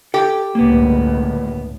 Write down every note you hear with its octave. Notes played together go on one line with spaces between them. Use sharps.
G4 A4 G5
G1 C#2 A2 A#3 B3